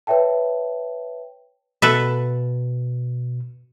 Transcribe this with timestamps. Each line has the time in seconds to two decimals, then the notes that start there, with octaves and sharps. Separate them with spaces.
0.07 B4 C#5 E5 G5 A5
1.82 B2 A4 B4 E5